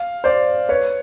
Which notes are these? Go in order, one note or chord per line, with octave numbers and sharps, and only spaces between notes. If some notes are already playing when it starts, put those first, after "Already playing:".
Already playing: F5
C5 D5
B4 C#5